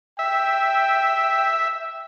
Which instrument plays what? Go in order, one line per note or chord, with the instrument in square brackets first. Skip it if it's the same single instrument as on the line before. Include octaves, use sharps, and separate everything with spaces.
[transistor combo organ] E5 [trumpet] G5